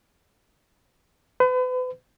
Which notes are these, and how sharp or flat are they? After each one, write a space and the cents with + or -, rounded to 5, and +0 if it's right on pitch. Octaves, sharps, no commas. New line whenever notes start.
B4 +40